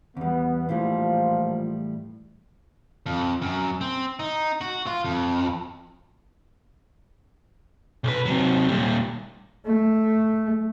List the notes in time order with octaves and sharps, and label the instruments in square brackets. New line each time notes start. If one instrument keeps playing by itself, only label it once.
[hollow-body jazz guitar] E2 G3 [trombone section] B3
[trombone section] A#1 F3 F4 [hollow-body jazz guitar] A2 E3 G3
[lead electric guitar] F2
F#2
C4
D#4
F#4
F4
F2
B1 B4
C3 F#3
A#2 G3
[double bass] A3